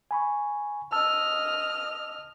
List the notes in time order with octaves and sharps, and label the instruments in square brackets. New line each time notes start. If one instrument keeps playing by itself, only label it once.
[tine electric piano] G#5 B5 C#6
[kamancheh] D#5 F6 [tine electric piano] A5 E6